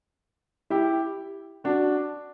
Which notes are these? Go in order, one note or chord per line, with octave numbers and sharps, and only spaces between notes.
E4 G4
D4 F#4